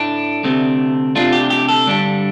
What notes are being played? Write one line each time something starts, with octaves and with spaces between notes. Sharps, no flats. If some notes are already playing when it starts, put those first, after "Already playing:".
Already playing: A2 A3 D4
D2 C3 A3 C4
C3 A3 D4 F4
G4
G4
A4
G2 D3 G3 D4